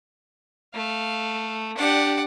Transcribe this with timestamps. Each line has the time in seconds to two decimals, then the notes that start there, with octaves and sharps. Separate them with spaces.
0.74 A3 F5
1.77 D4 G4 D5 F#5